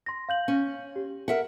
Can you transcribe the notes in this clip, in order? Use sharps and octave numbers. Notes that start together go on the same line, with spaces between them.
C6 A#6
F5 G6 F#7
C#4
G4
A#4 E5 F#5